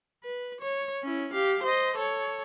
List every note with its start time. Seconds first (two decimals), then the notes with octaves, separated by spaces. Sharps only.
0.24 B4
0.61 C#5
1.03 C#4 E4
1.33 G4 F5
1.63 C5 D#5
1.96 A4 C#5